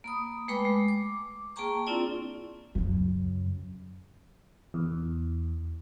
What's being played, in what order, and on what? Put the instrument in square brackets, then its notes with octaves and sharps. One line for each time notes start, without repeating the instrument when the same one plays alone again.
[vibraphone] A#3 B5 D#6
G#3 A3 B4 G5 B5 D6
G#3
D6
A#3 G#4 G5 A5 A#5 C#6
C4 D4 E4 F4 D5
[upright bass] F#2 C#3
[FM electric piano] E2